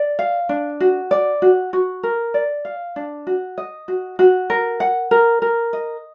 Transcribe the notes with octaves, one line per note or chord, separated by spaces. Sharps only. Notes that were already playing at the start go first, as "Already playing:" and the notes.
Already playing: D5
F5
D4
F#4
D5
F#4
F#4
A#4
D5
F5
D4
F#4
D#5
F#4
F#4
A#4
F#5
A#4
A#4
D#5